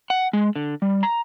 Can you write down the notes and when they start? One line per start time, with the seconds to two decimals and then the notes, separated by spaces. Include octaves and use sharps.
0.10 F#5
0.33 G#3
0.56 D3
0.82 G3
1.03 A#5